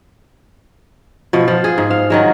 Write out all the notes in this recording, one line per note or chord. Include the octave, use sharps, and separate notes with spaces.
B2 F3
F3
G#4
G#2
F5
D#3 F#3 G#3